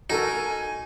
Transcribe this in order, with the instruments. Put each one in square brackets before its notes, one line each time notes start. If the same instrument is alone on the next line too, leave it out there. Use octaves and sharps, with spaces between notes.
[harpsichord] D#4 [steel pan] F#4 A4 A#4 [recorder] G#5